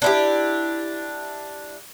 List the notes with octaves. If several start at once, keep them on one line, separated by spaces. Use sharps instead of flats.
D4 E4 G4